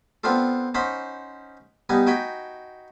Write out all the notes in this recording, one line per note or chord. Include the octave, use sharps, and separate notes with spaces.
B3 C4 D4 F4 A4
C#4 D#4 C5 F#5 B5
G3 B3 D#4 G#5
D#4 F#4 G5 G#5 B5